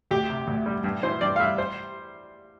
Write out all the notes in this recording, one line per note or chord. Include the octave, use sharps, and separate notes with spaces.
D2 G4
C3
D2
G3
G2
E3 C5
G2 D5
F5
G3 E5
C5